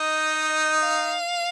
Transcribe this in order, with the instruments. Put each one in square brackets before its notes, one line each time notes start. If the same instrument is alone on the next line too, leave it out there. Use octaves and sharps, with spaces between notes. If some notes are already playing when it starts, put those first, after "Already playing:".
Already playing: [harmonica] D#4 [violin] D#5
[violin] F5